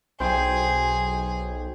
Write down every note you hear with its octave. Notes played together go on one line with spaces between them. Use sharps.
B1 G#4 C5 G5